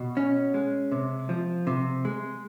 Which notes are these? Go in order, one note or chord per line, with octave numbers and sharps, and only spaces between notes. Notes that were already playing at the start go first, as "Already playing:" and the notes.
Already playing: B2
C#4
G#3
C3
F3
C3
G#3